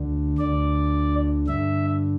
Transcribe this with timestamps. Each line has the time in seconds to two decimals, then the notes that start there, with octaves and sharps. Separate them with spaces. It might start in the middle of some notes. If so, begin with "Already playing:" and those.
Already playing: D2 D3
0.38 D2 D3 D5
1.47 G2 D3 E5